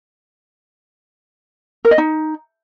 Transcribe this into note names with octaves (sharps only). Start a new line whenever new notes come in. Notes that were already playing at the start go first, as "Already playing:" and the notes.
A#4
D#5
D#4